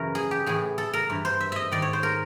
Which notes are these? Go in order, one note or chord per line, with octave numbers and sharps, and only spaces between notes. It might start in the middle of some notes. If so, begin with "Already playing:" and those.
Already playing: F#2 C#3 E3 A#4
G#4
G4
A2 E3 G#4
A4
A#4
G2 E3
C5
E5
D#5 E5
G#2 D#3 D5
C#5
C5
A#4